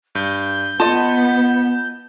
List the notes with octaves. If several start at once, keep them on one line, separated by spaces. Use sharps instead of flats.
G2 G6
B3 F4 D#5 A5